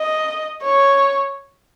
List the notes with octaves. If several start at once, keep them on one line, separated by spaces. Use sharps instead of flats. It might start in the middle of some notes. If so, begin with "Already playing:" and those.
Already playing: D#5
C#5